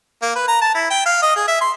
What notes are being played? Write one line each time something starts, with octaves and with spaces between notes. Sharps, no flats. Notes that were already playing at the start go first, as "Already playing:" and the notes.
A#3
B4
A#5
A5
E4
G5
F5
D#5
G#4
E5
C6